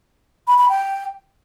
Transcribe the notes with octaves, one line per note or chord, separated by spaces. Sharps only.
B5
B5
G5